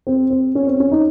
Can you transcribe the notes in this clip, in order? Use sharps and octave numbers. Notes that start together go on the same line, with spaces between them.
C4
C4
C#4
C4
C#4
D#4